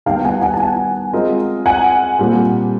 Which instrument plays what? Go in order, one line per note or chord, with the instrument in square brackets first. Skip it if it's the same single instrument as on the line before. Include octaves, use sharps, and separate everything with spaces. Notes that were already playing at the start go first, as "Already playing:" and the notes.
[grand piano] D#3 G3 B3 [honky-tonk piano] F5 G5
[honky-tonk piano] F#5 G#5
F#5 G#5
A5
F#5 G#5
[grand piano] G#3 C4 F4 A#4 D#5
[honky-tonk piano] F#5 G#5
[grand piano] A#2 G3 C4 F4 A4